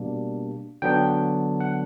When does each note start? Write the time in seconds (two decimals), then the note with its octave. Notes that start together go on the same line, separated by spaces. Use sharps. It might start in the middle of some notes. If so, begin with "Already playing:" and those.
Already playing: B2 G3 A#3 D4
0.82 D3 F#3 B3 D4 G5
1.60 F#5